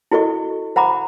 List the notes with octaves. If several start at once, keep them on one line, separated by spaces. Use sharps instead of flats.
E4 F#4 A4 D#5 C#6
C5 F#5 A#5 B5 D6